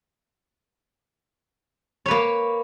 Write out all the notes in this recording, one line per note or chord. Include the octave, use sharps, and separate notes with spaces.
A#3 B4 C#5